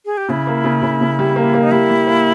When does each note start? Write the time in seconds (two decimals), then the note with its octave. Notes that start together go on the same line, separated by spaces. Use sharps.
0.05 G#4
0.17 G4
0.29 C#3 E4
0.47 A#3
0.64 C#3
0.82 C#3
1.01 C#3
1.19 G3
1.36 A#3
1.54 A#3
1.63 D#4
1.71 G3 E4
1.90 G3
2.07 A#3